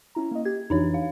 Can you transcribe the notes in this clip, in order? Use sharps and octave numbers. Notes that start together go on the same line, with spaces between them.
C#4 E4 A#5
A#3 D#5
G4 G#6
F2 E3 D4 D#4 C#5
F5